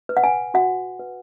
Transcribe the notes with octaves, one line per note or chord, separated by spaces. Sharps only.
B4
F#5
G#5
F#4 F#5
B4